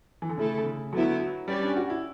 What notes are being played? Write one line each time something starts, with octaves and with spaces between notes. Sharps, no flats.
E3
D3
C#3 A3 E4 A4
D3
C#3
D3 F#3 B3 E4
F#3
G3 C#4 G4 B4 D5
D4
F#4
E4